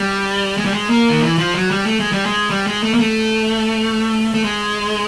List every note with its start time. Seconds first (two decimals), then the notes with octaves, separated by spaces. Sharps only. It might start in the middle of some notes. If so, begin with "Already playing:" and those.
Already playing: G3
0.58 G#3
0.65 G3
0.74 G#3
0.90 A#3
1.09 D#3
1.22 E3
1.38 F3
1.54 F#3
1.71 G3
1.86 A3
2.00 G#3
2.12 G3
2.25 G#3
2.50 G3
2.67 G#3
2.83 A3
2.94 A#3
2.99 A3
4.34 A3
4.44 G#3